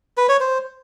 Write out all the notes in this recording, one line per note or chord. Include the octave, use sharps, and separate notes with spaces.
B4
C#5
C5